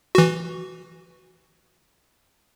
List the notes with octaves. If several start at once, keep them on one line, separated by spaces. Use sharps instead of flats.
E3 F#4